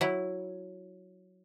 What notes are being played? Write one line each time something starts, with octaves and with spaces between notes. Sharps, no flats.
F#3 E4